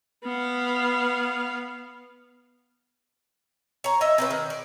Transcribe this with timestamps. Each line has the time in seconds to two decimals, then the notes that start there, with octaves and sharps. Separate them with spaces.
0.24 B3 F5
3.84 C#5 A#5
4.01 D#5 E5
4.18 C4 C#4 B4
4.31 D#3
4.50 D5